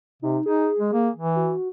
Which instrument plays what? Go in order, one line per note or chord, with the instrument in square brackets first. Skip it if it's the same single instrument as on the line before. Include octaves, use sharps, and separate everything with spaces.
[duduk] C3 [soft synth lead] D#4
[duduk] D#4 [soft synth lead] G#4
[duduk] G#3
A#3
E3
[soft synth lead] F#4